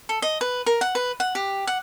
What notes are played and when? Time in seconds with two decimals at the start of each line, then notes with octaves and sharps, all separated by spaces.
0.09 A4
0.22 D#5
0.41 B4
0.66 A#4
0.81 F#5
0.95 B4
1.20 F#5
1.35 G4
1.67 F#5